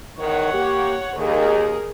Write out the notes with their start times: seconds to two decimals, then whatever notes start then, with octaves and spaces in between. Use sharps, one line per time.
0.18 E2 D#3 C#5 F#5
0.53 A#3 G4
1.17 D#2 G#4 A#4